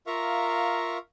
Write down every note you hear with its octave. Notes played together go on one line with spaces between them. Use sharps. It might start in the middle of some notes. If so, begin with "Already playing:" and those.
F4 A#4 E5 F5 A#5 C#6